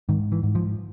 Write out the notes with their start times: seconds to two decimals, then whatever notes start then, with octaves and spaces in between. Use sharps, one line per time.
0.09 G#2 D#3
0.32 E3
0.43 G#2
0.55 F3